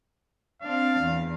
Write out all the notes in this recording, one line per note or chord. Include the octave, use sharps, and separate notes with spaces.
C4 D4 F5
E2